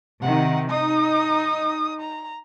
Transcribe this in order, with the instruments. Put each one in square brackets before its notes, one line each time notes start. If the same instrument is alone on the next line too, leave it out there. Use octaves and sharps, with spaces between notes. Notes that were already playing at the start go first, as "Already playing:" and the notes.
[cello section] C3 D#3 [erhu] F#5
[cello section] D#4 [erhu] D#6
[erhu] A#5